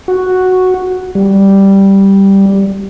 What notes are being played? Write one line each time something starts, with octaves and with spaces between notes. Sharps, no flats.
F#4
G3